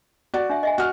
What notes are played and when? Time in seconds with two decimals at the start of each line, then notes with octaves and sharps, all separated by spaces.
0.34 F#4 D5
0.50 D4 E5
0.63 D#5 E5 G#5
0.78 F#4 F6